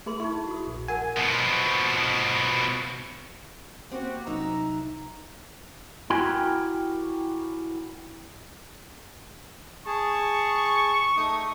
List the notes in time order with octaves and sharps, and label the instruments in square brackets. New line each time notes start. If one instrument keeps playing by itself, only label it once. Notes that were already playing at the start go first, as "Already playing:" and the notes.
[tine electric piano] A3 [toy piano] G#4 B4 C6
[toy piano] D#4 C#6 [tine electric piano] E4
[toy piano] F#4 D#6
[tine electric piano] A#1
[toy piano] A#4 F#5 [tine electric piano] G#5
[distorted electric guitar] B2 F3
[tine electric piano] A#3 C#4 [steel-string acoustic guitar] C4 [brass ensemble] F#4 G4
[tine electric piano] C2 C3 F#3 [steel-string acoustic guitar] D#4 E5 [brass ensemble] A#5
[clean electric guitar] E4 F#4 G4 A#4 G5 G#5
[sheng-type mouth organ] G#4 A5 [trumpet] C#6
[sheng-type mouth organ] A3 D#4 D#6